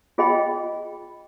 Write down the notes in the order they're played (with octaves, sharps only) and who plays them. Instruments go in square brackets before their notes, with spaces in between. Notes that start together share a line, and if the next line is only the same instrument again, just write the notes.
[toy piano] F4 G#4 D#5 G5 B5